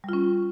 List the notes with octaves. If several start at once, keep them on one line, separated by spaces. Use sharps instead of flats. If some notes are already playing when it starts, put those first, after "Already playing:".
G3 C#4 F4